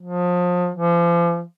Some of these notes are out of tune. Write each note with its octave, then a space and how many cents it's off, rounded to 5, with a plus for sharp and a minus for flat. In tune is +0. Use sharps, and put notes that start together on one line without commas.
F3 +30
F3 -35